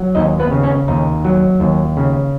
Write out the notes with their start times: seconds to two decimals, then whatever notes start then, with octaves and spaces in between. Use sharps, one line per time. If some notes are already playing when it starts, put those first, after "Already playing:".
Already playing: F#3
0.15 D#2 D#4 D#5
0.39 B3 B4
0.51 C#3
0.63 C#4 C#5
0.88 D#2 D#4
1.24 F#3
1.60 D#2
1.97 C#3